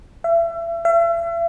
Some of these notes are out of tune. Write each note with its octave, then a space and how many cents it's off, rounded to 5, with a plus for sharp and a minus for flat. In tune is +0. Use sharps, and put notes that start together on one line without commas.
E5 +35
E5 +45